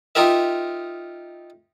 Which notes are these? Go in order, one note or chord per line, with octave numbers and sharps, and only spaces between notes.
D#4 F4 G4 A#4 E5